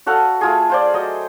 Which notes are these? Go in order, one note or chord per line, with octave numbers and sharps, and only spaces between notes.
F#4 A4 F5 F#5
A3 F4 G#4
F4 C5 D5
F#3 D#5